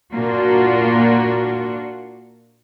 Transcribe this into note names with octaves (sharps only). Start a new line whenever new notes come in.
A#2 A#3 D4 F4 F#4